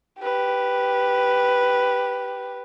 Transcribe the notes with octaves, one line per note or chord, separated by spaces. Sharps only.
G4 B4